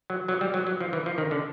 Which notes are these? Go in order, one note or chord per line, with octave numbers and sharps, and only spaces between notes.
F#3
F#3
G3
F#3
F#3
F3
E3
F3
D#3
D3